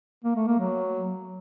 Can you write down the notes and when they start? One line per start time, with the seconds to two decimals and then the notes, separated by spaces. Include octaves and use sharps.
0.24 A#3
0.36 A3
0.47 A#3
0.59 F#3